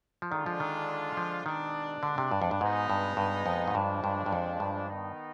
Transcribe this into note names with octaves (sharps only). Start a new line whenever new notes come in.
F3
D3 D#3 G#3 D4 F4
F3
D#3
F3
B2 D#3 G#3 D4
D3
C3
G2
F2
G2
G#2 B2 G#3 B3 D#4
G2
G2
F2
G#2
G2 F3 G#3 D4
G2
G2
F2
G2
D#3 B3 D#4